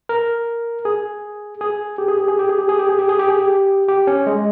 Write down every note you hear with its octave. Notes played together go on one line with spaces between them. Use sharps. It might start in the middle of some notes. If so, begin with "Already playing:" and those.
A#4
G#4
G#4
G4
G#4
G4
G#4
G4
G#4
G4
G#4
G4
G#4
G4
G#4
G4
G#4
G4
G4
C#4
G#3